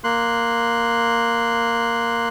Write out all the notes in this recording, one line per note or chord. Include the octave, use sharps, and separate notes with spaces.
A#3 C6 F#6